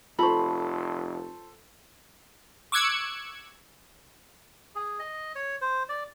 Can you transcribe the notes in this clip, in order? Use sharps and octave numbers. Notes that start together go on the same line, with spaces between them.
F1 F4 A4 C5 B5 C#6
C#6 D6 E6 F#6 G#6 C#7
G#4
D#5
C#5
C5
D5